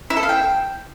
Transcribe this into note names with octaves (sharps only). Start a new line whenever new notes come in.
E4
A4
F5
G5